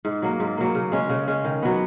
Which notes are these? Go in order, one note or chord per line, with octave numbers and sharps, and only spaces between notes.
G#2
F#3 A#3
G#2
F#3 A#3
C#3
G#3 C#4
C#3
G#3 C#4
D#3
F#3 B3